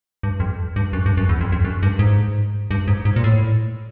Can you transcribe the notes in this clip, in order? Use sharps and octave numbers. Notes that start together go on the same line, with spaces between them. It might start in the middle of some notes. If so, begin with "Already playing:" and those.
G2
F2
G2
F#2
G2
F#2
E2
F2
F2
F#2
G2
G#2
G2
G#2
G#2
A#2
A2